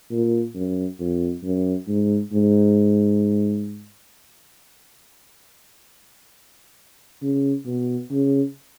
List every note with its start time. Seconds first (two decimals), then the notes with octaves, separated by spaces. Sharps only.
0.11 A#2
0.54 F#2
0.99 F2
1.43 F#2
1.88 G#2
2.33 G#2
7.22 C#3
7.66 B2
8.11 C#3